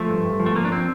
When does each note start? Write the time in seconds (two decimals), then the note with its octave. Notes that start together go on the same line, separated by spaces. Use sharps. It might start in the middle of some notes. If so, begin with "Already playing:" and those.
Already playing: F3 A3
0.09 G2
0.25 G2
0.40 F3
0.46 A3
0.55 F3 A#3
0.65 D4
0.72 C4